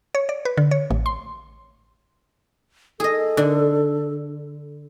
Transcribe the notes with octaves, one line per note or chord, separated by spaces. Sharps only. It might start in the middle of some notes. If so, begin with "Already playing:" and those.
C#5
D5
B4
D3
C#5
A1
C6
G#4 A4 D#5
D3